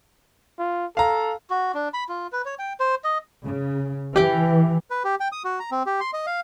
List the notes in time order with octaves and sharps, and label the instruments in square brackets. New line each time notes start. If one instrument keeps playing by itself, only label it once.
[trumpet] F4
[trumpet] A4 [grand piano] F5 A#5
[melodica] F#4
D4
B5
F4
B4
C#5
G5
C5
D#5
[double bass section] C#3
[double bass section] E3 [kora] G4 G5
[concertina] B4
G4
G5
D#6
F#4
A#5
C4
G4
C6
D#5
F5